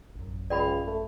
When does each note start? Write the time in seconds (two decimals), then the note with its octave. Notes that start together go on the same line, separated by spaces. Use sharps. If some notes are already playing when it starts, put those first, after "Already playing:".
0.16 A1 F#2
0.50 C#2 D5 G5 B5
0.87 A3